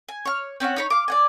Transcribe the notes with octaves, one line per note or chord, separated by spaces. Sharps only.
G#5
C#5 F6
C4 C#4 C#5 F#5
D#4 C#5 B5
F5 D6
D5 F#5 G#5